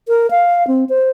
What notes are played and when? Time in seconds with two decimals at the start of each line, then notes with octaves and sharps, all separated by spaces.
0.08 A#4
0.31 F5
0.67 C4
0.89 C5